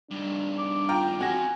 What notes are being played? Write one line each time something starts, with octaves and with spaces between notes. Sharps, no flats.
G2 D#3 D4
D6
F4 G5 A#5
C4 F#4 F5 G#5 A#6